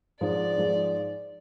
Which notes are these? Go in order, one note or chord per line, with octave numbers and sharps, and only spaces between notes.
G#2 F3 G#3 D5
G#2 F3 G#3